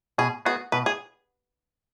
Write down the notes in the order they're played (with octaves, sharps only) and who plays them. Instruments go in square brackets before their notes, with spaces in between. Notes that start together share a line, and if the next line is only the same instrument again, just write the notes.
[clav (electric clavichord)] B2 [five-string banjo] G#4
[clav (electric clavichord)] B3 G#4 [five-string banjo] F#4
[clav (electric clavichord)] B2 [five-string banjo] B4
[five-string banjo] G#4